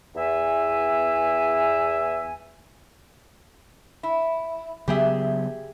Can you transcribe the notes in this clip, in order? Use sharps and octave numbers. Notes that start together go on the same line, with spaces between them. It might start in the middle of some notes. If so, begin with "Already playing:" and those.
E2 E5 G#5
E4
C#3 F#3 B3 G4 G#4 E5